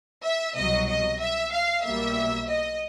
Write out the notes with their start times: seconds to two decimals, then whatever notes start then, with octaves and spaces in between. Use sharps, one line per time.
0.23 E5
0.55 C2 B2 F#3 D#5
0.88 D#5
1.20 E5
1.53 F5
1.84 B1 B2 G3 A#3 E5
2.49 D#5